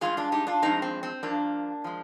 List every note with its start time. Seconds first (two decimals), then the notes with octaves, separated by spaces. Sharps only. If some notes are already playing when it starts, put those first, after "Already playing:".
0.01 G2 F3 G#3 F4 G#4
0.17 D4 F4
0.32 D#4 G4
0.47 D4 F4
0.62 G2 F3 G#3 C4 D#4
0.82 C4
1.03 C4
1.23 G2 F3 A#3 D4
1.84 F3 G#3